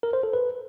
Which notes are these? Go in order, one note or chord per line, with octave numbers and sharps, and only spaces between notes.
A#4
C5
A4
B4